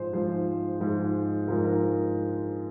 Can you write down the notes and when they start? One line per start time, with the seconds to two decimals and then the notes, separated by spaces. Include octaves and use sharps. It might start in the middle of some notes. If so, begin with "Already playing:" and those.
Already playing: G#2 F3 G#3 C5
0.13 G#2 F3 G#3 C5
0.80 G#2 F3 G#3
1.47 G#2 F3 G#3 A#4
1.65 A#4